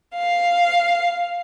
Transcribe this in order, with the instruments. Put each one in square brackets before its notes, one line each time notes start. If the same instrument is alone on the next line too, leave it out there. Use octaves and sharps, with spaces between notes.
[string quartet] F5